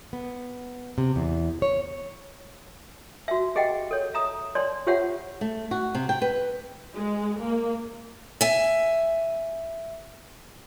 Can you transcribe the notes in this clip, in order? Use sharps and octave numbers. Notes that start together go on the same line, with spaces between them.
B3
C3
E2
C#5
F#4 E5
G4 G#4 D#5 E5 F#5 G5
A4 C#5
E5 A#5 D#6
C#5 D5 C6
F4 G4 C5 C#5 E5 F#5
A3
F#4
C3
G5
B4
G#3
A#3
E5 G#5